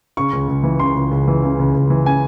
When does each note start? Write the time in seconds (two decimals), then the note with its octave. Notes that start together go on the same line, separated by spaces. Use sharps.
0.17 C#3 C#6
0.33 C#2
0.48 C#2
0.63 E3
0.80 C#3 C6
0.95 C#2
1.11 C#2
1.28 E3
1.43 C#3
1.59 C#2
1.74 C#2
1.90 E3
2.05 C#3 G#5